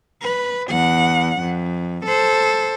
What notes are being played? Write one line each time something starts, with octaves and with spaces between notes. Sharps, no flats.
B4
E2 F#5
F2
A4 C5